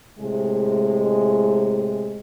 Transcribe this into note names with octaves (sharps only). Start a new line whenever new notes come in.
A2 C3 G#3